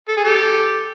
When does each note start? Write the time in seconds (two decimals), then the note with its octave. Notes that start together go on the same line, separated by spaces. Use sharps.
0.08 A4
0.17 G#4
0.24 G4 A4